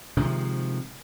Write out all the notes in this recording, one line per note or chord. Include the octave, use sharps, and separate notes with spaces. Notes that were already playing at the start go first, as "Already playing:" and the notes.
C3 D#3 F3 G#3